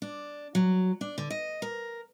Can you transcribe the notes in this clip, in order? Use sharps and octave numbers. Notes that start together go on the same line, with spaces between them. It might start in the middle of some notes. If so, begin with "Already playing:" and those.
D4
F#3
D4
D3
D#5
A#4